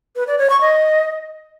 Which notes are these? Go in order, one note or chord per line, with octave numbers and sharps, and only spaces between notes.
B4
D5
C#5
C#6
D#5